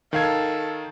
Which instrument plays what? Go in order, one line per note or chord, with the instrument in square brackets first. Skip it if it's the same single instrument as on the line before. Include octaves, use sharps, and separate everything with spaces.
[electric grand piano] D#3 F5 G#6 [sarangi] A4